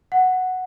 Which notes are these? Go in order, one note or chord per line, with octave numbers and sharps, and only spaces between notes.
F#5